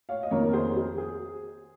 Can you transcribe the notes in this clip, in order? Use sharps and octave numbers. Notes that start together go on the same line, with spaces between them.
C#5 F5
D#5
F2 D#3 A#3 A#4 C#5
A#4
G#4 C5
G#4
G#4